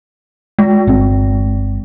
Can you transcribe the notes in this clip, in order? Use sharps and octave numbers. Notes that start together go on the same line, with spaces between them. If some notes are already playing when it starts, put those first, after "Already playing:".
G#3
G1 C4